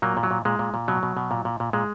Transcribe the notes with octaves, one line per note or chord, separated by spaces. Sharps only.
A#2 F#3 A#3
A#2
F#3
A#2
A#2 G#3
A#2
A#2
B2 F#3
B2
B2
A#2
A#2
A#2
A#2 G#3